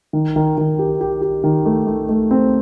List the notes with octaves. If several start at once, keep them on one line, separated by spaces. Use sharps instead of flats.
D#3
D#3
D#3
G4
G4
G4
D#3
A3
A3
A3
C4